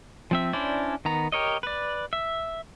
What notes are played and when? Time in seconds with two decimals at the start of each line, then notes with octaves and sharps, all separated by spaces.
0.31 F3 C4 E5
0.53 C#4 D4 E4 C5 D5
1.05 D#3 B3 A#5
1.32 G4 A#4 C#5 D#5
1.63 B4 D5
2.13 E5